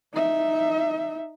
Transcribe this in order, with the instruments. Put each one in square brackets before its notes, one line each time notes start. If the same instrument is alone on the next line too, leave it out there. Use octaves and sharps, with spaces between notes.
[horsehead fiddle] D#4 E5